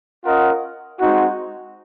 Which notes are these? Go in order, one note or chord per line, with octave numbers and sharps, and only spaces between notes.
C#4 F4 A#4 D#5 F#5
G#3 C4 D#4 F#4